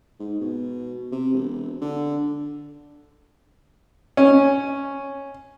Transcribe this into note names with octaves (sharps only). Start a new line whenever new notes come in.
G#2
B2
C3
E1
D3
C#4